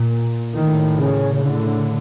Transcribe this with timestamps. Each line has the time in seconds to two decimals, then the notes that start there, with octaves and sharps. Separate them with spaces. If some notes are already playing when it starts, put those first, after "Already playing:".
Already playing: A#2
0.56 A2 D#3
0.97 C#3
1.38 A2 D3